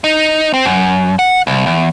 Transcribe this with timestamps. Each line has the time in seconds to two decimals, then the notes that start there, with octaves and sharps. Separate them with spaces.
0.04 D#4
0.54 C4
0.66 F#2
1.19 F#5
1.47 C2
1.66 E2